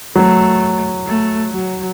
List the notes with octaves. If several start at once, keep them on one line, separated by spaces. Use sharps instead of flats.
F#3 A3
A3
F#3